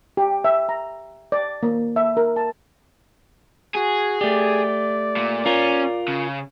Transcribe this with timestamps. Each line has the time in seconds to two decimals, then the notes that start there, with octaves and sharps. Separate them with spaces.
0.17 G4
0.45 E5
0.69 A#5
1.32 D5
1.63 A#3
1.96 E5
2.17 A#4
2.36 A5
3.75 F#4 G#4
4.21 A3 G4 D5
5.17 A#2
5.46 C#4 F4 A#4
6.08 C#3